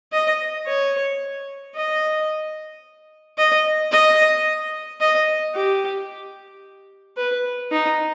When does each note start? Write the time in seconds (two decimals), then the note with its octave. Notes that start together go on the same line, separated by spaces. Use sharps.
0.12 D#5
0.67 C#5
1.75 D#5
3.38 D#5
3.91 D#5
5.00 D#5
5.55 G4
7.17 B4
7.71 D#4